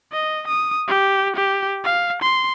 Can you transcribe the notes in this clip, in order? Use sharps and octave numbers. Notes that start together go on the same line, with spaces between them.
D#5
D#6
G4
G4
F5
C6